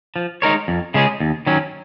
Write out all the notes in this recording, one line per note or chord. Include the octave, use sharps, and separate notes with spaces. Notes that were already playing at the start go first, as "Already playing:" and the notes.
F3
G#3 D#4 A#4 C#5
F2
C#3 G#3 C#4 G#4
D#2
D#3 F#3 C#4